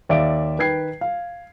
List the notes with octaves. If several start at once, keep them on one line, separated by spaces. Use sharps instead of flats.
D#2 D5 E5 F5 D7
D#3 B4 G5 G#6 C7
F5